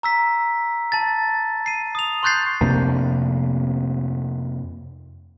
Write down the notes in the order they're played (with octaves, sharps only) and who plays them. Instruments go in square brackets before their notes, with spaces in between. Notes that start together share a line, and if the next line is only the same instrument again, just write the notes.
[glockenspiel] A#5 E6 B6
A5 A6
C7 D#7
D#6 F7
C6 C#6 F#6 G6 A6 C7
[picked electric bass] F2 C3 A#3 D4